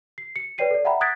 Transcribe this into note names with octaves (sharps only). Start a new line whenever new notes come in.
C7
C#7
B4 C#5 D5 G5 C7 D#7
A4 D5
E5 F#5 G5 A#5 B5
D#6 F#6 G#6 A6 B6 D7